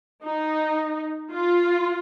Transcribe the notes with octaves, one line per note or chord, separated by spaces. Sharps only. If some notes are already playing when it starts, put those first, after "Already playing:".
D#4
F4